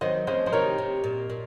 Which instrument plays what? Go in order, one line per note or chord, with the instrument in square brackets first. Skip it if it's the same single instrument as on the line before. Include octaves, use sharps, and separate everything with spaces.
[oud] D#3 F#3 [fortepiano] C5 D#5
[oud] C#3 F3 [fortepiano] C5 D#5
[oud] F3 [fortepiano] C5
[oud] C3 D#3 [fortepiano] A#4 C#5
[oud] C3
A#2
A#2